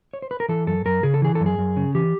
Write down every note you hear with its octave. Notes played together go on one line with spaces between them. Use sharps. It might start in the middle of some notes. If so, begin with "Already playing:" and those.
C#5
C5
B4
A#4
E3 A4
F#2 A4
F#2 A#4
C#3 G#4
A4
E3 G#4
A4
F#2
G#4
F#2
C#3
E3 G4